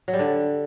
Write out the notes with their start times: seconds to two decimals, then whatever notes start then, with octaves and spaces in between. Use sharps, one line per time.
0.08 F#3
0.14 G3
0.19 D3